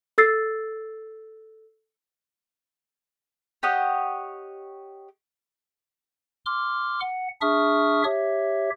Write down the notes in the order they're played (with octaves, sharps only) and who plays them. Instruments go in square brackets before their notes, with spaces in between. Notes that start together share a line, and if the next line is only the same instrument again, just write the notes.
[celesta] A4 E6 A6 C7
[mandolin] G4 C#5 D#5 F#5
[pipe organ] C6 D6 F6
F#5
D4 G#4 E5 C#6 D#6 F6
G4 C#5 E5